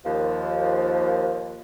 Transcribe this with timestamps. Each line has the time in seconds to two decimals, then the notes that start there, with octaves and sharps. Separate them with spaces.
0.04 D#2 F3